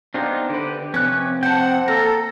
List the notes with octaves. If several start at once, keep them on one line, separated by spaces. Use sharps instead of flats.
B3 D4 D#4 F4 G4 C5
D3 G4 B4
F2 C3 C#4 B4 C#5 F#6
C4 C5 F#5 G5 A5
A#3 A4 A#5